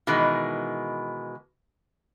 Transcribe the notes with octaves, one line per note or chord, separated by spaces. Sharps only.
B2 D#3 E3 G#3